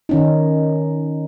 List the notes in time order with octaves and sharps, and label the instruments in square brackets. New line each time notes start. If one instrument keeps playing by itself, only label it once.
[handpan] D#3 C#4 D#4